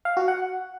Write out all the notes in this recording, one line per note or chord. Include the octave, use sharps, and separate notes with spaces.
F5
F#4
F#5